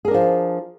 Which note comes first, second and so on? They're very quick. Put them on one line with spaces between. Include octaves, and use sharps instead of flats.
G#4 A#4 D4 F3